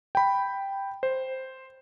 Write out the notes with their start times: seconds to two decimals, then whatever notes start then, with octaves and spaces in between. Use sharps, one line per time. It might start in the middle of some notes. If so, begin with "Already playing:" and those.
0.15 G5 B5
1.03 C5